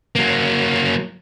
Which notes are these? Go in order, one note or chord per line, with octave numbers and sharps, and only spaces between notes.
F#3 A#3